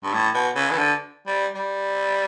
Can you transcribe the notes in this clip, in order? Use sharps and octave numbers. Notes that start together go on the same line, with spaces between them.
G2
A2
B2
C#3
E3
D3
G3
G3